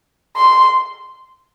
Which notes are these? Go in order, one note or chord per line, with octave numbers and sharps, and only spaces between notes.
C6